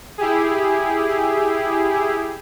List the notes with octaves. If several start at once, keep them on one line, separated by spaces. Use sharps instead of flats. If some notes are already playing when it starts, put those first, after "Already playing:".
E4 G4 G#4